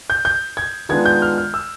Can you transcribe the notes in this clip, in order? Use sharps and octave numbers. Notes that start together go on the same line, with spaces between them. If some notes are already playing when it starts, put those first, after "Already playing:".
G6
G6
G#6
D#3 G#3 B3 D4 F4 G#6
G6
F6
F6
E6